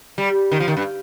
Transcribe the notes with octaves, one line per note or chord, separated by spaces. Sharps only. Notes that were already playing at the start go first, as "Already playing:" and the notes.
G3
D#3
F3
D#3
G2